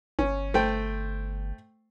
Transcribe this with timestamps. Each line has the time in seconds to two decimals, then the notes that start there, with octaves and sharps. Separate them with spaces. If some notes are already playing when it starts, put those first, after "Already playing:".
0.19 G1 C#4
0.54 A3 C5 G5